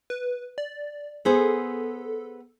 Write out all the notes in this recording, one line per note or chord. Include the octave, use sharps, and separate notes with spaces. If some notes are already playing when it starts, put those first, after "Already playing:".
B4
D5
B3 G#4 A4 C5